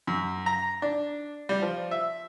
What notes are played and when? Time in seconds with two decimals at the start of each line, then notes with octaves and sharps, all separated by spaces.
0.07 F#2
0.46 A#5
0.82 D4
1.49 G3
1.62 F3
1.91 E5